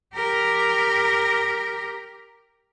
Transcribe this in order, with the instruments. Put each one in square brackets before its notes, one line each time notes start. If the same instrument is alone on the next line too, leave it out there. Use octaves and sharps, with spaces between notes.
[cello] G4 A#4